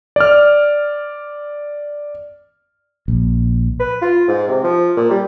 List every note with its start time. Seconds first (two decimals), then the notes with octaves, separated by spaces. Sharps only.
0.16 D5 F6
3.08 A#1
3.79 B4
4.02 F4
4.28 G#2
4.48 C3
4.64 F3
4.97 A#2
5.10 G3